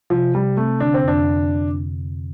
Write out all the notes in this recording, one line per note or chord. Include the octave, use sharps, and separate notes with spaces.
C3 F3
C3 G3
A3 C4
D3 D4
C4
F2 D4